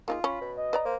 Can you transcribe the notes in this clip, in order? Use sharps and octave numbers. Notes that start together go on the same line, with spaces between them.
A#3 D#4 F4 G#4
C#4 B5
B2
D#5
B4 D5 A#5
A#3 C5